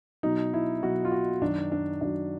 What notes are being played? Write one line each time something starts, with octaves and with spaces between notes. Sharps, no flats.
B2 F#3 D#4
E4
B2 F#3 F#4
F4
F#4
F#2 D#3 F#3 D4
D4
F#2 D#3 F#3 D4